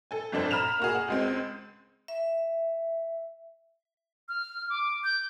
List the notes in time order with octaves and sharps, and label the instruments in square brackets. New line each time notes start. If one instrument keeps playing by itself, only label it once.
[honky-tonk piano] A4 G#5
G1 F2 D4 A4 C5
A#5 B5 F6 E7 F7
A#3 F#4 G#4
F#5
C#2 G#3 C4
[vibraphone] E5
[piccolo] F6
D6
G6